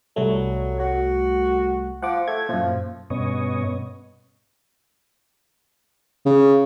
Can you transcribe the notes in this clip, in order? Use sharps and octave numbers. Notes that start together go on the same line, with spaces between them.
C2 F#3 G3 A3
F#4
F3 F#5 D6
A3 G#6
F#2 A#2 F3
G2 B2 B3 C#4 C#5 D#5
C#3